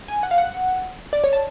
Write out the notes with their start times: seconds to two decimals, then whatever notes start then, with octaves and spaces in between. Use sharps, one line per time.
0.08 G#5
0.23 F#5
0.31 F5
0.38 F#5
1.13 D5
1.24 C#5
1.33 A5